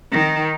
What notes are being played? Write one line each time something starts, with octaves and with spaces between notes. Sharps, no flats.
D#3